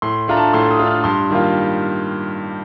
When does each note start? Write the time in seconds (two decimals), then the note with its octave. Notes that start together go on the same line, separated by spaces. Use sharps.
0.02 A2 C6
0.28 A3 D4 F4 A#5
0.37 A5
0.53 A2 C6
0.71 D#6
0.79 A3 D4 F4
0.87 F6
1.04 G2 C6
1.30 D#3 G3 A#3 F4